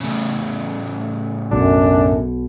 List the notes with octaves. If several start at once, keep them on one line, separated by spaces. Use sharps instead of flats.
A2 C#3
B1 F#2 B2 D4